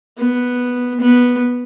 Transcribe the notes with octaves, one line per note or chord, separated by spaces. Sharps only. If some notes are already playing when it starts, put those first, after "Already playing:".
B3
B3